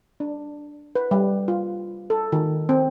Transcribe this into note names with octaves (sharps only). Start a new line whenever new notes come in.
D4
B4
G3
F4
A4
D#3
C4